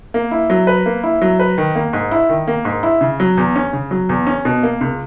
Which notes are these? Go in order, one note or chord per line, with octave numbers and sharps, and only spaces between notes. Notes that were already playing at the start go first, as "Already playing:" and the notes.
A#3
E4
F#3
B4
A#3
E4
F#3
B4
D#3
A#3
G#2
E4
D#3
A#3
G#2
E4
C#3
F#3
E2
C#4
C#3
F#3
E2
C#4
B2
A#3
C#2